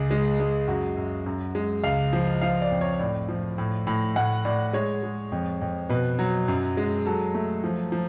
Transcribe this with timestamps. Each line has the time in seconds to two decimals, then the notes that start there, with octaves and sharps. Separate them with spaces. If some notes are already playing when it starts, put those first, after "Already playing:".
Already playing: C#2 G#4
0.11 G#3
0.40 G#3
0.68 F#2 F#4
0.97 F#2
1.26 F#2
1.55 G#3
1.84 C#2 F5
2.13 F3
2.41 F3 F5
2.62 D5
2.71 F2
2.81 C#5
2.99 A2 D5
3.29 F3
3.58 A2
3.87 A2
4.16 A2 F#5
4.45 A2 D5
4.73 G#3 C#5
5.03 G#3
5.32 F2
5.61 F2
5.89 B2 B4
6.19 F#3
6.48 F#2
6.77 G#3
7.06 F#3 A4
7.34 A3
7.64 F3
7.92 F3